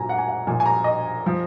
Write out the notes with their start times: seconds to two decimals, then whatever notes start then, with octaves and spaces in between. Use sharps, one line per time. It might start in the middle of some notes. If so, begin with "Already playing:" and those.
Already playing: A#2 F#3 G#5 A#5
0.09 F#5
0.18 G#5
0.28 F#5
0.47 A#2 F3 G#5
0.60 G#5
0.66 A#5
0.84 D#5
1.26 F3